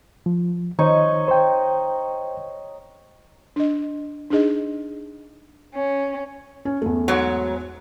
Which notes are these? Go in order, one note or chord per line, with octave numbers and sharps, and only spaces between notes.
F3
D#3 D#4 C5 C#5 D#5
C5 G5
D4 D#5
D4 D#4 G#4 D#5
C#4
C#4
E2 A3
G#2 F#3